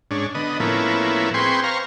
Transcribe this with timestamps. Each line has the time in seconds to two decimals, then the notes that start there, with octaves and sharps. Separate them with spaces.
0.11 G#2 C#4 D4
0.35 D3 B3 D#5
0.60 A2 F3 A#3 B3 C#4 E4
1.34 C4 G#4 B4 G5 C6 C#6
1.64 C5 F5 A#5 C#6